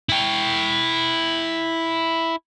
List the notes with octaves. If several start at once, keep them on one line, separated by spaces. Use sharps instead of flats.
E4 G5